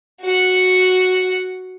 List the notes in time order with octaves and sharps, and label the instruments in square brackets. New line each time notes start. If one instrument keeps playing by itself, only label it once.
[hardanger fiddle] F#4 F#5